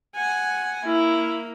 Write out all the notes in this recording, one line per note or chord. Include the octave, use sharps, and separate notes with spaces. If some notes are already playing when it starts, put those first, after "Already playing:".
F#5 G#5
A#3 E4